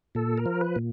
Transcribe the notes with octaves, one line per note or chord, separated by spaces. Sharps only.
A#2 A4
A#4
F3
B4
A#2